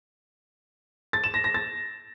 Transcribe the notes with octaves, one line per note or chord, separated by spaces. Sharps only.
A6
E7
A#6
A#6
A6